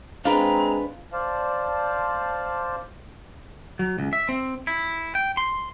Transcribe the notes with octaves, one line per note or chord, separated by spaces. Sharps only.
G#3 C4 D4 F4 B4 A#5
C5 D5 F5 A5
F#3
C#2
E5
C4
E4
G5
C6